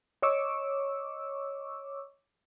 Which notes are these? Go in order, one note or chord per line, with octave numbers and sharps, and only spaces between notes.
C#5 D#5 C#6 D6 E6